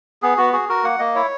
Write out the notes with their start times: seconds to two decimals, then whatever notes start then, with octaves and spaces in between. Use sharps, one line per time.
0.22 B3 G#4
0.37 B3 F#4
0.53 F#4 G#4
0.69 F#4 A#4
0.84 A#3 F#5
0.99 A#3 D#5
1.15 E4 C#5